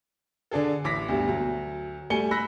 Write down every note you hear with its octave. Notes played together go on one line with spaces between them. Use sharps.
D3 D4 G#4 A4
A1 D6 A#6 B6
D2 G2 B2 G3
D2 F#3
G3 A3 G#5 C#7 G7
B5 E6 F#6 A#6 B6